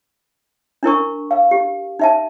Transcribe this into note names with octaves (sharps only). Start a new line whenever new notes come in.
D4 E4 A#4 C#6
F5
G4
D#4 E5 A5